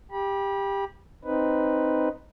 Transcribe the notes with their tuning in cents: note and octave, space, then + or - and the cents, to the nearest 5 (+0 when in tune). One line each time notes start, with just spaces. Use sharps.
G4 +15 B5 -30
C4 +0 D#4 +0 B4 +0